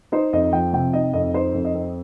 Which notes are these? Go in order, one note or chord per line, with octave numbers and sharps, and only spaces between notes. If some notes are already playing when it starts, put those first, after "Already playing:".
D#4 C5
F2 D#5
F3 G5
C3 G5
D#4 D#5
F2 D#5
D#4 C5
F2
D#5
C4